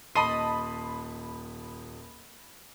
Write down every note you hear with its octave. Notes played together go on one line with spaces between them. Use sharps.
D#1 D#5 A5 B5 C6 C7 D#7